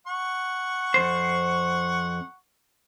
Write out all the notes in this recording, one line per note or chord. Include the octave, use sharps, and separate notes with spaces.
F#5 C#6
F2 C5